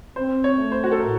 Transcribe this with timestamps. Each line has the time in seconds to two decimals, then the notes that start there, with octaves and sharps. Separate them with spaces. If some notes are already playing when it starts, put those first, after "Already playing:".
0.16 C4 C5
0.44 C#5
0.58 A3
0.72 C5
0.84 F#4
0.91 A4
1.00 A2 A#4